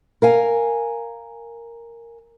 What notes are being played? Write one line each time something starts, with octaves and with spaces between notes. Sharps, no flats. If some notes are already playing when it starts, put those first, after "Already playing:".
A#4 F5 G#5